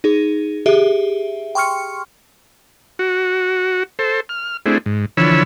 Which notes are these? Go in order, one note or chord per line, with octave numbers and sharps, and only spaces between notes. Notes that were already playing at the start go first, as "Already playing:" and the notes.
D#4 G#4
G4 G#4 E5
G5 C6 C#6 F6 C#7
F#4
A4 C5
F6
A3 C4 D4 E4 G#4
G#2
D3 E3 F3 C#5 B5 E6